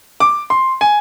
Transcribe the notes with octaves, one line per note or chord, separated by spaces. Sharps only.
D6
C6
G#5